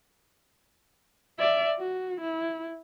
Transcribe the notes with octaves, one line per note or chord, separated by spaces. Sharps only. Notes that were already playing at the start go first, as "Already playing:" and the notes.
D5 E5
F#4
E4